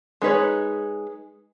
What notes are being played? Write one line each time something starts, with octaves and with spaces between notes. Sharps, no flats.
G#3 D#4 B4 C#5